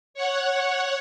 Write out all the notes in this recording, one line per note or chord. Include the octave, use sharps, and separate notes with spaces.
C#5 F#5